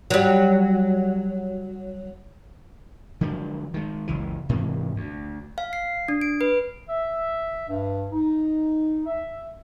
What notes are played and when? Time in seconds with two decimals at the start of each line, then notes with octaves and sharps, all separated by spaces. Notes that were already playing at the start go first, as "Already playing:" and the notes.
0.10 F#3 G3
3.21 D3 F3 F#3 G#3
3.74 D#3 G#3
4.07 F#1 C#2 E3
4.49 G#2 C3 E3 A#3
4.96 D2
5.58 F5
5.73 C7
6.08 D4
6.21 D7
6.41 B4
6.89 E5
7.69 G2
8.12 D#4
9.06 E5